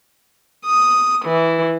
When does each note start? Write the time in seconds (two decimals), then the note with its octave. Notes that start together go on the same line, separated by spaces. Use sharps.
0.65 D#6
1.24 E3